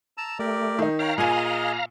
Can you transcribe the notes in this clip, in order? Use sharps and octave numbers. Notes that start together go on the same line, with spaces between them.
A5 A#5 E6
A3 G4 A#4 D5
D#3 D#4
C#5 F5 G5 A#5
A#2 G#4 D#5 G#5